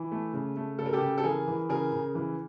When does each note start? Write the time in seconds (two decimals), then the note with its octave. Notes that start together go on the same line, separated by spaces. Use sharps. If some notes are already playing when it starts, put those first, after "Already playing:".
Already playing: E3
0.12 A3
0.33 C#3
0.56 A3
0.79 C#3 A4
0.86 A#4
0.93 G4 A4
1.02 C#3
1.18 A4
1.24 E3 G#4 A#4
1.47 E3
1.69 C#3 G#4 A#4
1.93 C#3
2.15 E3